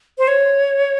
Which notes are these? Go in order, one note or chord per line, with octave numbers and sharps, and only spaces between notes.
C5
C#5